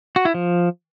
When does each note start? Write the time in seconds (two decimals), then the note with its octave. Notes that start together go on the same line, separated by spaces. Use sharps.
0.16 F#4
0.25 E4
0.34 F3